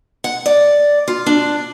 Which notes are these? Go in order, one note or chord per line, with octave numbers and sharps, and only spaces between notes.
F#5
D5
F4
D4